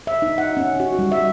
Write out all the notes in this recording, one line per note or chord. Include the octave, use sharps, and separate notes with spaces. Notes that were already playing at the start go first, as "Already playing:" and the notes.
E5
D#4
F#5
C#4
F#4
G3
E5